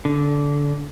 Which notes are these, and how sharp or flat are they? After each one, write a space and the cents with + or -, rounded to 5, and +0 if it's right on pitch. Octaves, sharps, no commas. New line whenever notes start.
D3 -20